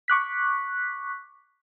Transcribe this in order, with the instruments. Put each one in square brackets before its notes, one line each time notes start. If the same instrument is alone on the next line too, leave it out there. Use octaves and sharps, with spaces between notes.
[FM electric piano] C#6 D6 F#6 B6